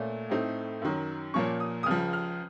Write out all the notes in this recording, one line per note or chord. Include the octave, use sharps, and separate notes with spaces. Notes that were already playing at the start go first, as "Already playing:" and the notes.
Already playing: A#2 A3 C#4
A2 A3 C4 D#4
F#2 D#3 F#3
A#2 F3 A#3 C#4 C#6
D#6
D#6
C#2 C#3 F3 F6
F6